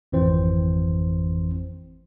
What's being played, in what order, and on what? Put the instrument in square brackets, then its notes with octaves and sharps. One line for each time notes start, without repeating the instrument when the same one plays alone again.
[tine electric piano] G#1 F2 E3 C4 C5